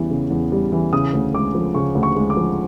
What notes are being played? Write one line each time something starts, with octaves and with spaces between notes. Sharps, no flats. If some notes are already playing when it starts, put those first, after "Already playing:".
Already playing: E2 C#3 E3 G3
C#3
E2
G3
E3
C#3 D#6
D2
G#3 D6
F3
C#3 C#6
D2
C#6
G#3
D6
F3